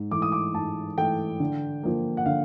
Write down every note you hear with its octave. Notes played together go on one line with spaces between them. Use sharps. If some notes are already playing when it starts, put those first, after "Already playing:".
Already playing: G#2
E3 A3 D6
D#6
D6
G#2 A5
E3 A3 G5
D3
F3 A#3
F#5
D3 F5